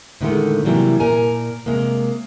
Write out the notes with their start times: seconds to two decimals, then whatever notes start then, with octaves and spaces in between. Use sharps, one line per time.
0.21 A2 D3 D#3 F3 G#3 A3
0.65 C3 E3 F#3 G3 A#3
1.00 A#2 A#4 G#5
1.66 C3 G#3 A#3